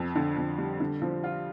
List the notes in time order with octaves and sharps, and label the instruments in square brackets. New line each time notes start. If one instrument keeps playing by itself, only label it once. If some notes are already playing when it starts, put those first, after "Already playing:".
Already playing: [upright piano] F2
D3
F2
G3
D3
F3
F4